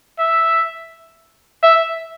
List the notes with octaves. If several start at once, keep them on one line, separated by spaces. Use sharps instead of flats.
E5
E5